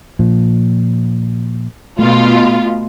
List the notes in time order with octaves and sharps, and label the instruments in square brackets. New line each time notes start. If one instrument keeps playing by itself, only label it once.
[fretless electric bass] A#2 F3
[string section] B2 F4 [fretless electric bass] A3